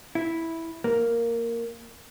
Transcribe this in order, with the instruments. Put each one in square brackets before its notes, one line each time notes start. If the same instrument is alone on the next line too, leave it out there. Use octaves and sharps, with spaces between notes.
[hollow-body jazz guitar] E4
A#3